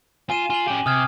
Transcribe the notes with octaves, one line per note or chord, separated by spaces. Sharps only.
F4 G#5 D#7 E7
F4 G#5 F#7
C#4 G4
C3 D#6 F6 G#6